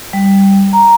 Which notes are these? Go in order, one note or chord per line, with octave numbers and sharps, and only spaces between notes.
G3
A#5